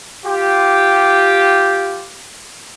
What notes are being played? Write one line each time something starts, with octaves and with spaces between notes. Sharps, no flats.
F4 G4